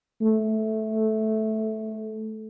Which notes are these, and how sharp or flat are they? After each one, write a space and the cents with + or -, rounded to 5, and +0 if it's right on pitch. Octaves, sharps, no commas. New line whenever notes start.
A3 -10